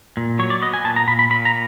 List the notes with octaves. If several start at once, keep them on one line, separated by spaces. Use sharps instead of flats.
A#2
F#3 C#5
D5
B3 D#5
G#5
A#2 A5
A#5
A#2 B5
B5
A#2 B5
A#5